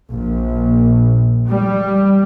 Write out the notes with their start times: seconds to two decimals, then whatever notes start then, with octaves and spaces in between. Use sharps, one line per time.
0.11 A#1
1.48 G3